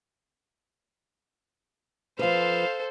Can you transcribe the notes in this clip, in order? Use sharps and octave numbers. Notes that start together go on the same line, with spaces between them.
F3 A4 B4 C5 F5